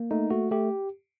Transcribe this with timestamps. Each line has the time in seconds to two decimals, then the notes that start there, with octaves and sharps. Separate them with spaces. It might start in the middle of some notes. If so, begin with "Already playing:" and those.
Already playing: A#3
0.11 A3 D#4
0.30 A3 F#4
0.51 A3 G4